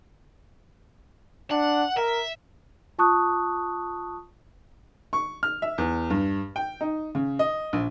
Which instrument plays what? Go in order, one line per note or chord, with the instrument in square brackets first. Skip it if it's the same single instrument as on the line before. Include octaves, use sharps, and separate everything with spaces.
[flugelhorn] D4 [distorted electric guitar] F#5
[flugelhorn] A#4 [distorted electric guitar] E5
[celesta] F4 A5 C#6 D#6 F#6
[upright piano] C#6
F6
E5
E2
G2
G5
D#4
C#3
D#5
A#1